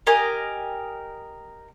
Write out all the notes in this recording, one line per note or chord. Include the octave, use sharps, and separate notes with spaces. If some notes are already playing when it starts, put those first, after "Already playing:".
G4 A#4 D#5 G#5